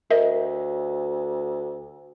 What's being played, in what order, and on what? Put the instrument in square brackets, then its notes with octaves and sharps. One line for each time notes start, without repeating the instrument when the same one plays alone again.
[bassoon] D2 [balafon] A#4 [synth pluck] D#5 E5